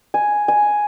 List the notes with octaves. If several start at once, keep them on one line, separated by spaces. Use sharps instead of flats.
G#5
G#5